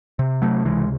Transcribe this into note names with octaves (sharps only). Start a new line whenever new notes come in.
C3
F#3 A3
C#2 E3 G#3